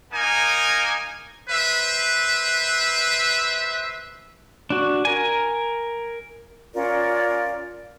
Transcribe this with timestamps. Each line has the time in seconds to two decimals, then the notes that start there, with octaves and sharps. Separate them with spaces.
0.12 A#3 D#4 A#4 G#5
1.49 B4 C5 E5
4.70 D4 F#4
5.05 A#4 G#5
6.74 C#4 F4 A#4 D5